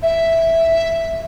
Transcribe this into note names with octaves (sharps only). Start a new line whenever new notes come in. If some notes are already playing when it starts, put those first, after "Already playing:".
E5